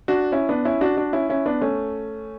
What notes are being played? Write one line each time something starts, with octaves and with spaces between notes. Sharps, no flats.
D4 F#4
C#4 E4
B3 D4
C#4 E4
D4 F#4
D4 F#4
C#4 E4
C#4 E4
B3 D4
A3 C#4